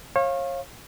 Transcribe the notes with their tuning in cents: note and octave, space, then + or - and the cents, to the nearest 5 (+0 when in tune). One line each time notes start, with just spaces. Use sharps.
C#5 -35 F5 +0